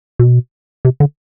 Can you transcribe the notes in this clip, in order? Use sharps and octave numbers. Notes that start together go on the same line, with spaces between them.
B2
C3
D3